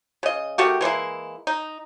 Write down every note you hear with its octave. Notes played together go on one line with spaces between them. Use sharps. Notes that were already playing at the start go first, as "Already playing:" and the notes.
C#3 D#5
D#3 A3 F#4 G4
E3 G#3 A#3 E4
D#4